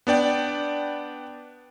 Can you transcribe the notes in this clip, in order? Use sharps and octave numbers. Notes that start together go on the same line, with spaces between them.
B3 D4 D5 G5